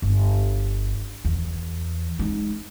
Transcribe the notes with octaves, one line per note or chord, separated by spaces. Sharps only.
G1
E2
G#3 D#4